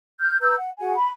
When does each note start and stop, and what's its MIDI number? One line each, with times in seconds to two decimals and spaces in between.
0.19 0.38 89
0.19 0.38 91
0.41 0.55 71
0.41 0.55 82
0.41 0.55 88
0.41 0.55 91
0.58 0.71 78
0.79 0.95 66
0.79 0.95 68
0.79 0.95 78
0.79 0.95 80
0.95 1.10 83